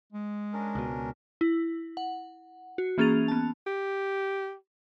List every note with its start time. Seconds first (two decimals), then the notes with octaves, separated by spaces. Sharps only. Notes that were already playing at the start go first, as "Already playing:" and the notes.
0.13 G#3
0.53 C#4 D4 A#4
0.75 C#2 B2
1.41 E4
1.97 F#5
2.78 F#4
2.98 E3 A#3 C#4 G#4 A6 F7
3.28 B3 A5
3.67 G4